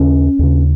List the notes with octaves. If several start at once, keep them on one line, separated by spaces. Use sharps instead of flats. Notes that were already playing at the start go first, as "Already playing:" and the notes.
Already playing: D#2 C#3 C#4
D#2 C#3